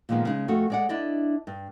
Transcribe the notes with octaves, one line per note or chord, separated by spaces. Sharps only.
A#2 D#3 F3 G#3 B3
C#3 G#3 D#4
F2 A3 F#4
G#3 D5 F#5
D4 E4 D5 D#5
G2